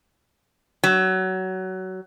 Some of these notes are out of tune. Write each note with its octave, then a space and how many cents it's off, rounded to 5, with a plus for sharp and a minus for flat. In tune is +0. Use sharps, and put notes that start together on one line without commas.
F#3 +20